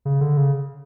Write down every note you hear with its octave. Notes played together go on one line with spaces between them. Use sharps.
C#3
D3
C#3